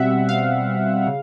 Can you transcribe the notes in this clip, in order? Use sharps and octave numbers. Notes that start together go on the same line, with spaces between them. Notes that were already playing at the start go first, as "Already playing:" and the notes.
Already playing: B2 G3 C4 E5 F#5
F5
C#3